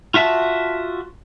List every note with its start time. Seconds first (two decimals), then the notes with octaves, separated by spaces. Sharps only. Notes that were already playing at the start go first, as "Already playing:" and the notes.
0.14 F4 F#4 E5 A5